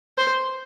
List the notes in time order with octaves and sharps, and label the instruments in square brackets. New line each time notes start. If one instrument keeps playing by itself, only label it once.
[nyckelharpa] C5